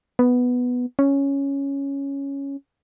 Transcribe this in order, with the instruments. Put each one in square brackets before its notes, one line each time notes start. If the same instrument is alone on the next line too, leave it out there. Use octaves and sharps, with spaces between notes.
[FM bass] B3
C#4